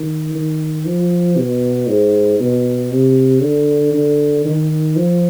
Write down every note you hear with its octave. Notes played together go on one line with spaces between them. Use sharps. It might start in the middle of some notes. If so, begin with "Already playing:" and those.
Already playing: D#3
D#3
F3
B2
G#2
B2
C3
D3
D3
D#3
F3